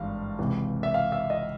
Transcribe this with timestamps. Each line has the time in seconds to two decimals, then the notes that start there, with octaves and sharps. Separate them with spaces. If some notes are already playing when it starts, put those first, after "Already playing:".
Already playing: G#1 G2 E3 F5
0.39 C#2 C3 E3
0.83 E5
0.94 F5
1.12 E5
1.30 D#5